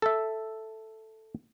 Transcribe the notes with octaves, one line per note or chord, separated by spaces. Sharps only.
A4 E5